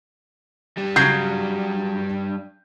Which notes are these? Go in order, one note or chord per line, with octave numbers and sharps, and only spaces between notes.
G3 D4
C#3 F#3 G6 C7